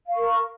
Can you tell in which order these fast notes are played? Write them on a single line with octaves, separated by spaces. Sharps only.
F5 C#6 A#4